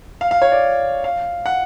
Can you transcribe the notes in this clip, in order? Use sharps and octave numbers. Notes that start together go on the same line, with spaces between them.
F5
F5
C#5
D5
F5
F#5